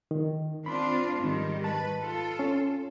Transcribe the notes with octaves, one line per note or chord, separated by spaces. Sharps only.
D#3
C4 D4 F4 B5 C6
G#2 D#3 G3
B4 A5
F4 A4
C#4